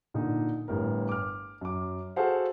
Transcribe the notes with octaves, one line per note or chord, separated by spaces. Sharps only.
A#2 D3 D#4
G1 A2 A#4
D6 F6
F#2 D6
F#4 G#4 A4 C5 F5 F#5